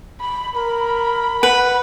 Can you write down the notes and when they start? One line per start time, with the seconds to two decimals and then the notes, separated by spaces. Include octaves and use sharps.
0.21 B5
0.56 A#4 B5
1.43 B4 F#5